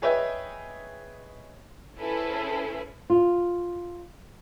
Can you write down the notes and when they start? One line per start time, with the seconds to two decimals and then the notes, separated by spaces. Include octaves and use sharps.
0.02 G#4 B4 C#5 D#5 E5 G5
1.98 C#4 E4 G#4 A4 B4 C5
3.10 F4